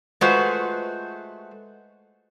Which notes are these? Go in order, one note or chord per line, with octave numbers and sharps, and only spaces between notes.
G#3 A3 F4 F#4 B4 C5